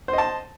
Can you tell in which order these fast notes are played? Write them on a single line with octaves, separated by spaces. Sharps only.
C5 D#5 A5